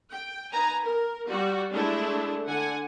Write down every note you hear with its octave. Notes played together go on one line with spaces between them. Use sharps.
G5
D#4 B4 G#5 A#5
A#4
G3 F#4
G#3 A3 D4 E4
D3 F#5 G#5